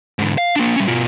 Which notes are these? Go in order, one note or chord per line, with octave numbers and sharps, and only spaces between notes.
G#2 D3
F5
A#3 D4
G3 C#4
B2 F4